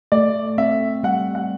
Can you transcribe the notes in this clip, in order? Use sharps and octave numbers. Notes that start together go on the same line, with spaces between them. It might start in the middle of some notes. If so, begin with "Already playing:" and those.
A3 D5
C4 E5
G3 F#5
F#5